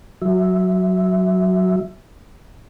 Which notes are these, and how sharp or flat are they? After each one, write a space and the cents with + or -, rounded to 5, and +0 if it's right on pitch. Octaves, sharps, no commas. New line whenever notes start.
F#3 +0 E5 +0